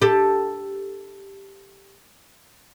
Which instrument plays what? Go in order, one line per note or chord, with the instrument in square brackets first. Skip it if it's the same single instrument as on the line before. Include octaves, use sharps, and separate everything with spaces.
[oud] G4 A4